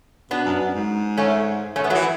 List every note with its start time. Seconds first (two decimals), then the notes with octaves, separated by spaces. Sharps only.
0.31 B2 B3 D4
0.46 F#2
0.60 F#2
0.75 G#2
1.17 A3 C#4
1.76 A3 C#4
1.84 B3
1.90 F#3 A3
1.95 E3